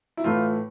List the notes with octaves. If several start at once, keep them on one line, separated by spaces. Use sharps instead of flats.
E4
A2 E3 A3 F4